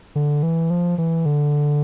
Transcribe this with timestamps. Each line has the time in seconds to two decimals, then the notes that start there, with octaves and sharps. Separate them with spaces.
0.16 D3
0.43 E3
0.70 F3
0.98 E3
1.26 D3